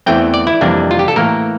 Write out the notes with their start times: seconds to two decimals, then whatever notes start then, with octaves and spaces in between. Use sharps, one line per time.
0.06 E2 E3 A3 C4 G5
0.34 D5
0.47 E4
0.61 F2 C3 E3 G3 A#3 D4
0.91 F4
0.99 G4
1.08 A4
1.16 A2 E3 A#3 A#4